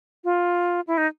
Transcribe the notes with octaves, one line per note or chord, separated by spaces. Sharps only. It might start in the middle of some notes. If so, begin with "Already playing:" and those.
F4
E4
D#4